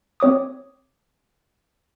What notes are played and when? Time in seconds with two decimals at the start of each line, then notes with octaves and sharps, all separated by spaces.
0.20 C4 C#5 D6 D#6